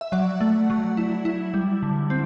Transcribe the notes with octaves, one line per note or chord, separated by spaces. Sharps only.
E5
F#3 D5 F#5
A3
F#3
E4
E4
G3
D3
C4